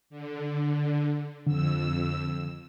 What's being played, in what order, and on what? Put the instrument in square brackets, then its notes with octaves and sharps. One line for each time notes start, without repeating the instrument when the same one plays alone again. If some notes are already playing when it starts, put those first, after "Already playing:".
[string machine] D3
[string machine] F2 E6 [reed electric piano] D3